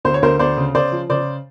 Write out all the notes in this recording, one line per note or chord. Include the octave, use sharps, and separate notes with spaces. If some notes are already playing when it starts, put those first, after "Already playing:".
D2 C5
C#5
D2 A#4 C5
D2 C5 D5
C#3
C#3 C5 D5
F3
C#3 C5 D5